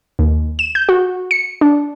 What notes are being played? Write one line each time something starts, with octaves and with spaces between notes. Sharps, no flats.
D#2
E7
G6
F#4
C#7
D4